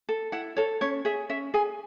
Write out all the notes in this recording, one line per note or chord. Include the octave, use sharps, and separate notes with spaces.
A4
E4 F#5
A4 C#5
C#4 C#5
G#4 E5
C#4 E5
G#4 G#5